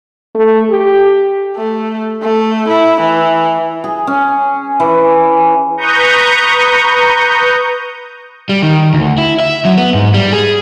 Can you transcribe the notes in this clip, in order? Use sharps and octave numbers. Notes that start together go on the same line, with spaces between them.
A3
G4
A3
A3
E4
E3
G#4
C#4
E3
B4 A#5 C#6 D#6 G6
G3
D#3
D2
E4
E5
F#3
B3
G#2
G3
G#4